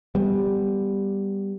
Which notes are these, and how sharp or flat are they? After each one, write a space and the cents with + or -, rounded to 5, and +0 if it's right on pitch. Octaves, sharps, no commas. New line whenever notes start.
G3 +5 B3 +0